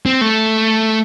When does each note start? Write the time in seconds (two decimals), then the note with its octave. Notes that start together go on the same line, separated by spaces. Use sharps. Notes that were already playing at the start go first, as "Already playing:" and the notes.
0.06 C4
0.21 A3